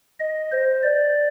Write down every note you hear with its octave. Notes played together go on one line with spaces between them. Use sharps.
D#5
C5
D5